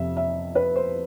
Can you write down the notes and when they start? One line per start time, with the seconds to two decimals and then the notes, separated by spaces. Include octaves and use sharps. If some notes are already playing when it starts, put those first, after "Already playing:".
Already playing: F2 C3 F3 E5
0.17 E5
0.55 B4
0.76 C5